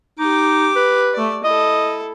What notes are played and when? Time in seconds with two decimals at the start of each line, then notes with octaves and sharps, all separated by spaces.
0.19 D#4 G4 D6
0.76 B4
1.14 A3 D5
1.44 E4 A4 D#5